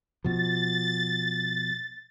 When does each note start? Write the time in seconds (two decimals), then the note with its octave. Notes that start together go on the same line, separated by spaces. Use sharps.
0.24 B2 F3 A6